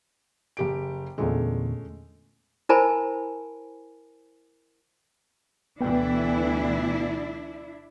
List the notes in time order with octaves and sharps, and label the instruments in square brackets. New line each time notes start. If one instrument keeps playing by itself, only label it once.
[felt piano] F#1 G4 D7
[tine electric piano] E2 A#2 D3 [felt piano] G#3 A3 C#4
[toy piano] E4 A#4 C5 G#5 A5 B5
[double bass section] D2 B2 E3 [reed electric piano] B3 G5 [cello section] D4 E4